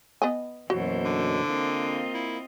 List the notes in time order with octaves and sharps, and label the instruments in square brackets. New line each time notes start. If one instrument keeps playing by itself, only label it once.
[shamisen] B3 D#5 G#5
[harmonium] F#2 B2 F#3 [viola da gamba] E3 A#3 C5 [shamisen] F#4
[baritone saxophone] D3
[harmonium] A#3 [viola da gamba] C4 F4 D#5
[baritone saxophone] E4